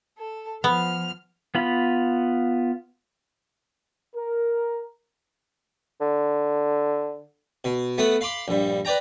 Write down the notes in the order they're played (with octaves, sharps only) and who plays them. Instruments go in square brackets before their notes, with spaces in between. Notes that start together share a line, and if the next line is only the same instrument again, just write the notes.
[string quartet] A4
[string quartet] F3 F6 [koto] B3
[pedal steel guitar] B3 F4 B5
[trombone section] A#4
[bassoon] D3
[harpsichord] B2
A3 B3 F#5 D#6
F5 B5 C6 D6
A#1 G2
B4 D5 G5 A#5